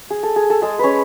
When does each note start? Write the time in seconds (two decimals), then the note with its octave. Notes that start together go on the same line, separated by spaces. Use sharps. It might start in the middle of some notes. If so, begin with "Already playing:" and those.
0.10 G#4
0.23 A4
0.36 G#4
0.50 A4
0.62 G#3 G#4
0.79 C#4 B4 C#5